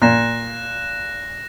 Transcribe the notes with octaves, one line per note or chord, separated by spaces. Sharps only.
A#2 F#6 A#6 E7